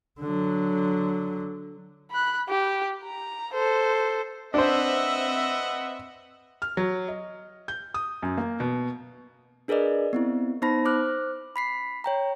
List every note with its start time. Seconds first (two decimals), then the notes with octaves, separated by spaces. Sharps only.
0.21 D3 F#3
2.11 B5 F#6
2.49 G4
3.04 A#5
3.53 A4 C5
4.54 C4 D4 B4 C5 D#5 E5 F#5
6.62 F6
6.77 F#3
7.08 D#5
7.68 G6
7.94 D#6
8.23 F#2
8.38 A#3
8.60 B2
9.68 D4 G#4 A#4 B4 D5 D#5
10.13 B3 C4 E4
10.62 B3 D#4 C5 A5 B5 A#6
10.85 C5 D6 F6 F#6
11.56 B5 B6 C7
12.04 C#5 G5 A#5